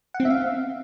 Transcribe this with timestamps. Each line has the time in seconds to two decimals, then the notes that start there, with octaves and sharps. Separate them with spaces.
0.14 F#5
0.20 C4
0.25 E5
0.30 F5